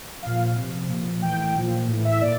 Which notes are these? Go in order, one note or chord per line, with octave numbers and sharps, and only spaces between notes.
A#2 F3 F5
C3 F3
A#2 F3
A2 E3 G5
A#2 F3
A2 E3
E5
A#2 D5